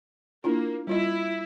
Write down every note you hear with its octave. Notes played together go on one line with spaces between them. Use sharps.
A#3 D4 E4 F4
G3 E4 F4 D#5